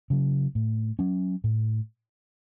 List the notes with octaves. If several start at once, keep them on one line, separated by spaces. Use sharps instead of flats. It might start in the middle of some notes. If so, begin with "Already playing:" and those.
C#3 F#3
A2
F#3 C#4
A2